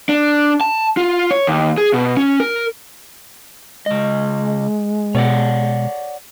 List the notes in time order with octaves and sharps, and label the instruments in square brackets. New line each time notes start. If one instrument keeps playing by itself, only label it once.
[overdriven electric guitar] D4
A5
F4
C#5
D#2
G#4
B2
C#4
A#4
[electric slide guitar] C#3 D#5 [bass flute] G#3
[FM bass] B2 [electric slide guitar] C#5 D5 F#5